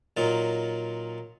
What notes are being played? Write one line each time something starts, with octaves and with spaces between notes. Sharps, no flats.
A#2 F#3 D#4 F4